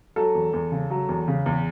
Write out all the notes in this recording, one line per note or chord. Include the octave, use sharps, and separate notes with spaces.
F#3 A4
E2
E2
C#3
F#3
E2
C#3
E2